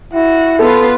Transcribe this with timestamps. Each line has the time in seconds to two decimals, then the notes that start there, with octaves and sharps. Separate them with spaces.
0.13 E4 F#4
0.59 B3 F4 A4 B4